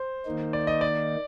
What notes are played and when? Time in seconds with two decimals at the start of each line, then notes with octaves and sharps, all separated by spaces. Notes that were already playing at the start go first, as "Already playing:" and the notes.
Already playing: C5
0.25 D#3 A#3 D#4
0.53 D5
0.67 D#5
0.81 D5